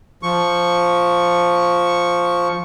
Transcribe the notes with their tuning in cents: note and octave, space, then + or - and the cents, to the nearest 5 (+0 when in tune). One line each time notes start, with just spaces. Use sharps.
F3 +0 C#6 +0